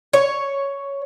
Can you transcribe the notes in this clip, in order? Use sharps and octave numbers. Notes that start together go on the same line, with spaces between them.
C#5